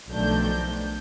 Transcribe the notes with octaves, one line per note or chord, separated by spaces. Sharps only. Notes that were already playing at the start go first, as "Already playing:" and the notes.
B1 D#3 F3 A3 D4 G6